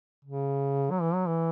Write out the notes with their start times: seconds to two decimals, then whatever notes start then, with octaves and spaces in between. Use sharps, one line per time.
0.25 C#3
0.91 F#3
1.01 E3
1.14 F#3
1.27 E3